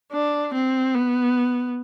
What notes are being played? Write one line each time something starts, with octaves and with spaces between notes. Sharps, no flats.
D4
C4
B3